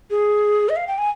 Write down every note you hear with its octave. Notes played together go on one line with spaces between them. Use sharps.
G#4
D#5
F5
G5
G#5